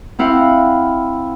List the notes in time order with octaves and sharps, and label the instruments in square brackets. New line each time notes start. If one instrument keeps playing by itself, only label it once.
[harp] C4 E4 F5 F#5